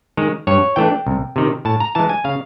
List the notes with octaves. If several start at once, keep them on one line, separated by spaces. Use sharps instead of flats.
D#3 G#3
G2 C#5
E3 A3 D4 G5
C2
C3 D#3
A2 A5
A#5
E3 G#3 A5
G#5
C#3 F5